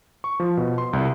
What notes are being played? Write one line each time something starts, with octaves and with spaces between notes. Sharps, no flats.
C#6
F3
B2
C6
C2